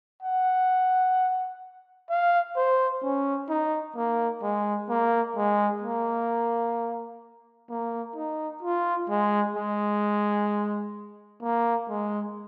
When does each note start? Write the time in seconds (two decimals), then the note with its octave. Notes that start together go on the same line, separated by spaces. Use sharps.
0.23 F#5
2.10 F5
2.56 C5
3.03 C#4
3.49 D#4
3.96 A#3
4.43 G#3
4.89 A#3
5.36 G#3
5.82 A#3
7.70 A#3
8.16 D#4
8.63 F4
9.09 G#3
9.56 G#3
11.43 A#3
11.89 G#3